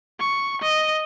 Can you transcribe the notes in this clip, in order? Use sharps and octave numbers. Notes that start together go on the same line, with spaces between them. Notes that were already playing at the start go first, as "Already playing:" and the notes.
C#6
D#5